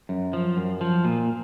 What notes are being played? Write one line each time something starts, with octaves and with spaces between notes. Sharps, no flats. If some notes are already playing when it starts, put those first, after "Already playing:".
F#2
F3
F#2
F3
A#2